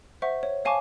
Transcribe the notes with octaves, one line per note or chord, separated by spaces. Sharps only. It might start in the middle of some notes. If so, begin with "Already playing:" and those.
C5 E5 F#5 C#6
C#5
C#5 F5 G#5 A5 C#6 D6